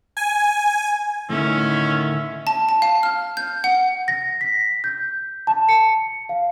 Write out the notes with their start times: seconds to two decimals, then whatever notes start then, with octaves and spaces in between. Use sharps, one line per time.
0.17 G#5
1.29 A2 D3 D#3 C#4 E5
2.47 A5
2.69 A5
2.82 F5
3.03 F6
3.37 G6
3.64 F#5
4.08 A#6
4.41 B6
4.84 G6
5.47 A5
5.69 C#7
6.29 F5